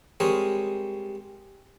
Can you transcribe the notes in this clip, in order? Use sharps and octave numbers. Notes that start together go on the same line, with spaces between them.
G3 G#3 C4 A#4 C#5 D#5